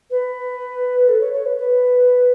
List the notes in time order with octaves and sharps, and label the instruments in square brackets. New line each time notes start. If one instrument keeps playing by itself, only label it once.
[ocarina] B4
A4
C#5
C#5
B4
B4